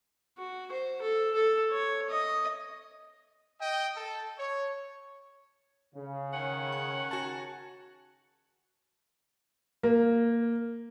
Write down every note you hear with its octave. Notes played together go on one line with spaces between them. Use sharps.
F#4
C5
A4
A4
C#5
D#5
D#5 G5
A4
C#5
C#3
D#3 C#4 F#5
G#5 F#6
F#4 G#5 A5
A#3